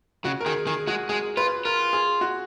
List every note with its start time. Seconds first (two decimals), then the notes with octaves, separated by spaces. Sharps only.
0.25 C#3 F#4
0.41 A#4
0.46 D#3 G#4
0.67 D#3 G#4
0.87 G#3 F#4
1.09 G#3 G#4
1.37 F4 B4
1.65 F4 A#4
1.93 G#4
2.21 F#4